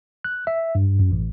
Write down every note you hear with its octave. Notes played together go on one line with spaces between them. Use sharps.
F#6
E5
G2
F#2
A1